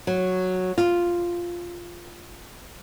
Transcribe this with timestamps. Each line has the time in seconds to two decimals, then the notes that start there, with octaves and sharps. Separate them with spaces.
0.07 F#3
0.78 F4